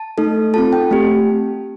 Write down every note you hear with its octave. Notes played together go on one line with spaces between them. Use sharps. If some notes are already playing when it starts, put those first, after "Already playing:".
Already playing: A5
A3 D#4 A4
C4 F4 A4 A5
G5
A3 C4 G4